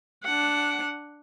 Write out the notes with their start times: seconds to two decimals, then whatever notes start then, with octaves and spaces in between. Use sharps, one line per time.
0.24 D4 F#5